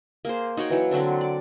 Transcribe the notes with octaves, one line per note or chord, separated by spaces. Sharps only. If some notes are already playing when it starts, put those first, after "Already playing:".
A#3 G#4 C5
D#4 F#4 C#5 G5
E3 F#3
D3 F#3 C4 D4
D5